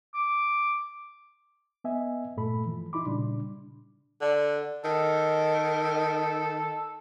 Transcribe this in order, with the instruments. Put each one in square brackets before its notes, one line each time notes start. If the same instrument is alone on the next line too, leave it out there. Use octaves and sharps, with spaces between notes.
[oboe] D6
[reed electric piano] B3 D#5 E5 G#5
G2 A#2 A3 A4 B5
E3 F3
D#4 E4 B5 C6 D6
A#2 C#3 G3 D4
[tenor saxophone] D3
[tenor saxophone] D#3 [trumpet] A4